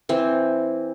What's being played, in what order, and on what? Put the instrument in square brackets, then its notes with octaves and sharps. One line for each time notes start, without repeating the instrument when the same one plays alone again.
[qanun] E3 C4